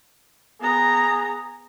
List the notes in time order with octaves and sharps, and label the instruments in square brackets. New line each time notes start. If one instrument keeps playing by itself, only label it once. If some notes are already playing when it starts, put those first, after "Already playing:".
[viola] B3 A#5 [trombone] G#4